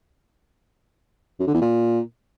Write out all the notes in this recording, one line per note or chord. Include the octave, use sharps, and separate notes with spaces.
F#2
D3
E2
A#2